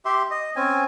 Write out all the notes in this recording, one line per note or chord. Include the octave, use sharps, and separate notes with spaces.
G4 E5 C6
D#5
C4 C#4 G#5